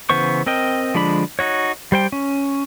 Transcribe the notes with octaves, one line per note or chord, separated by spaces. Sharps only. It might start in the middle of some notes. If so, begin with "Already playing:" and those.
C#3 E3 B3 C5 C#6
C4 A#4 D#5 G5
D3 F3 G#3 D4 B5
D#4 F#4 C#5
G3 C5 G5
C#4